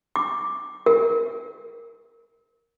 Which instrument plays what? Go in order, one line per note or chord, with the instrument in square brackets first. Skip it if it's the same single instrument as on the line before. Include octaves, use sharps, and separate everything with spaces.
[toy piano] D6
A#4